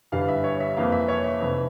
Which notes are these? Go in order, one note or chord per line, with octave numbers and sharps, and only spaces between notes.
G1 G2 E3 G3 F5
E5
C#5
E5
F2 E3 A#3 F5
E5
C#5
E5
F1 F2 E3